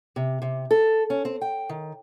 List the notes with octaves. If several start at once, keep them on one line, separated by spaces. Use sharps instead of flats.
C3
C3
A4
C#4
C4
G5
D#3